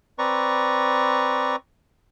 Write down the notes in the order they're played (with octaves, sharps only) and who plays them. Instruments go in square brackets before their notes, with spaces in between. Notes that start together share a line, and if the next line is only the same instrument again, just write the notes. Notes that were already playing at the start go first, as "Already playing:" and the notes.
[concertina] C4 B4 D5 A#5 C#6